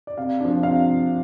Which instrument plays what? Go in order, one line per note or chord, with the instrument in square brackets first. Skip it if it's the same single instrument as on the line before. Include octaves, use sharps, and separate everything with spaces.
[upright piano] D5
C3 F5
F3 D4
C3 F5